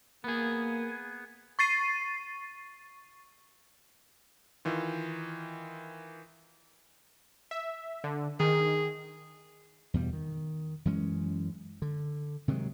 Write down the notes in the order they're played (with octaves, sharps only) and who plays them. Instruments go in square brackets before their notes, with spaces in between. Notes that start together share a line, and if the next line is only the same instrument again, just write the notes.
[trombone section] A#3 [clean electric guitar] B3 G#4
[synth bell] C#6 A6 C7 D#7
[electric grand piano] D#3 E3 F4
[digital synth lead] E5
D3
[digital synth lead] D#3 [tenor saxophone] G#4
[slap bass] E2 B2 G3
D#3
F#2 E3 G#3 C#4
D3
C3 D#3 F#3 G#3